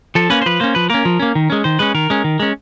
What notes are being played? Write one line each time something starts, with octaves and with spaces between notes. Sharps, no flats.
F3 A4
A#3 C#4 B4
C5
F3 B4
A#3 C#4 C5
F3 B4
A#3 C#4 A#4
F3
A#3 C#4
D#3
G#3 C#4
D#3 C5
G#3 C#4 B4
D#3 A#4
G#3 C#4
D#3
G#3 C#4